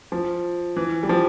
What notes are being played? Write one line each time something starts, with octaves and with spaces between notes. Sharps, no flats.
F3
E3
G3
F3